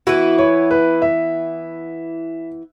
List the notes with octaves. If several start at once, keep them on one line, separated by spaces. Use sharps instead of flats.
E3 B3 E4 F#4
C#5
B4
E5